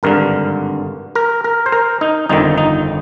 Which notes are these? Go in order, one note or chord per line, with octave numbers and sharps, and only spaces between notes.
G#1 G2 D3 A#4
A#4
A#4
C5
A#4
D#4
G1 F2 D#3 D#4
D#4